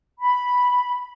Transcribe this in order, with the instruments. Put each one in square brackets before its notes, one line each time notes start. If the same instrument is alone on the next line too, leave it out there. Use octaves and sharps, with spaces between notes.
[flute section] B5